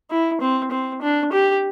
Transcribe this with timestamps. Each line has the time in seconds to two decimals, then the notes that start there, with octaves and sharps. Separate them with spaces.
0.10 E4
0.41 C4
0.71 C4
1.02 D4
1.32 G4